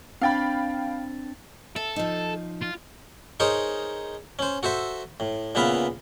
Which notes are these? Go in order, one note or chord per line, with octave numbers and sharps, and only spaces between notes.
C4 D4 F5 G5 B5 A6
A4 E5
F3 D#4
F4
D#4 G#4 A#4 C5 C#5
C#4 C5
F#4 A4 C5 E5
A2
A#2 C#3 B3 B4 E5 F5